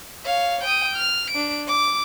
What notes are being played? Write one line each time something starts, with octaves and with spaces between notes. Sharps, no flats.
C#5 F5
G5 D#6
F6
D4 D7
D6